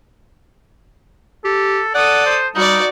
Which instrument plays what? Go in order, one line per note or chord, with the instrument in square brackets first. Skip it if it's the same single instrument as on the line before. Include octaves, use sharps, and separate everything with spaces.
[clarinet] G4 [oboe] A4
[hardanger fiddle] A4 D#6 [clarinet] D5 [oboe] F#5
[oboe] C5
[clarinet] G3 [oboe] D#4 [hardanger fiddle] F#4 D5